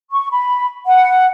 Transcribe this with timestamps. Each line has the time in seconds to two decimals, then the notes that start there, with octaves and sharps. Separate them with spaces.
0.11 C#6
0.31 B5
0.86 F#5